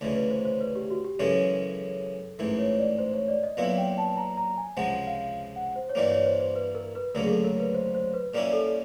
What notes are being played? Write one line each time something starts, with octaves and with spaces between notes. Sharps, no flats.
D2 C#3 E3
B4
C5
C5
B4
G4
F#4
G4
F#2 C#3 E3 G#3 C#4 A4
A1 G#2 E3 A#4
C#5
D5
C5
C#5
D5
D#5
B1 A#2 F#3 B3 E4 F5
G5
A5
A#5
A#5
G#5
C#2 C3 F3 G#3 F#5
F5
F#5
C5
C#5
G2 E3 G3 A#3 D5
C#5
C5
C5
B4
A#4
B4
D2 C#3 F#3 A#3 A#4
G#4
A4
A#4
B4
C5
C5
B4
A#2 G3 A#3 C#4 E4 A#4
A4